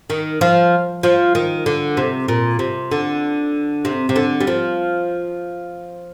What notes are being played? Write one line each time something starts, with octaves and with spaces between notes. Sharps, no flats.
D#3
F3
F3
D#3
D3
C3
A#2
C3
D3
C3
C3
D3
G3
F3